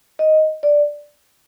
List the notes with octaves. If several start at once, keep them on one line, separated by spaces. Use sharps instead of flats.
D#5
D5